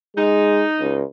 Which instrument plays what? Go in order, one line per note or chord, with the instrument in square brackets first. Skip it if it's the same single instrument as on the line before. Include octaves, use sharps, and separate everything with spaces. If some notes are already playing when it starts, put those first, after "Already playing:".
[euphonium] G#3 [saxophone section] D#4
[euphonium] C#2